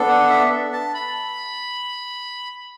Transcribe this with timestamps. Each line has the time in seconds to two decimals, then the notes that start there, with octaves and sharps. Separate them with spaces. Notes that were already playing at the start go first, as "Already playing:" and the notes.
Already playing: B3 D4 A4
0.08 F#5
0.30 E5
0.73 A5
0.94 B5